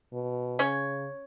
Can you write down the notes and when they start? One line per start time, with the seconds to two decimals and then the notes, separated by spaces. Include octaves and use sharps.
0.12 B2
0.59 C#3 C#4 C#5